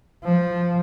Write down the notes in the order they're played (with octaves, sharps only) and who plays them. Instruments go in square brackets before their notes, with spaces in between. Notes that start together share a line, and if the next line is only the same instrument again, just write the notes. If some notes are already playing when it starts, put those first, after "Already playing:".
[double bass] F3